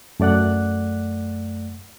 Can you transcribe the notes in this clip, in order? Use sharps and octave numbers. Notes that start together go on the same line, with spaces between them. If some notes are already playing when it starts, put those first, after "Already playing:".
F#2 A3 D5 F#5 F#6